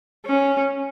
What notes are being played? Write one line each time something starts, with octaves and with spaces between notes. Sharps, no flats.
C#4